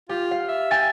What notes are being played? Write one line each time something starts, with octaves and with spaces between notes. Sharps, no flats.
F4 G4
F5
E5
G5 G#5 A6